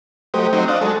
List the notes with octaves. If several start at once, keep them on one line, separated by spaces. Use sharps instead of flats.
F#3 A3 G4 C5 D#5
F#3 C4 D#4
D4 D#5 F5 F#6
F#3 G#3 A4 A6